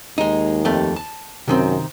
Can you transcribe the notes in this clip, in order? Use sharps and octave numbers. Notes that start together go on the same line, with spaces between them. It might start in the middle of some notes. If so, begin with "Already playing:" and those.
D#2 G#3 D#4
F2 A3 G4
A5
F#2 C3 D#3 C4